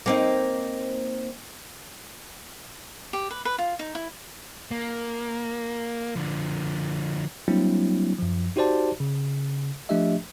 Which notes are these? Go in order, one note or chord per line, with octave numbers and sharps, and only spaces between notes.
A#3 C4 D#4
G4
B4
B4
F4
D#4
E4
A#3
D3 F3
F#3 G3 A#3 C4 D4 E4
F#2 F3
D#4 F#4 G4 C5 D5 A5
C#3
F3 A3 D4 G4 D#5 E5